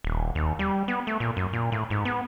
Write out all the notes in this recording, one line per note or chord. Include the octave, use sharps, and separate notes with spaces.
D#1
D#2
G3
B3
A3
A#2
F#2
A#2
A2
G#2
B3